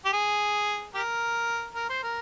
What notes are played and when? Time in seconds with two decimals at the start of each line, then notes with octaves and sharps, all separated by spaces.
0.05 G4
0.13 G#4
0.95 G4 A#4
1.75 A#4
1.89 C5
2.03 A#4